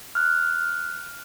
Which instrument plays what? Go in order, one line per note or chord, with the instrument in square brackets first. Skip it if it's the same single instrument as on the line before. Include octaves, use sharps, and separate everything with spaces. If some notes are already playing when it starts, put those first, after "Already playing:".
[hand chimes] F6 F#6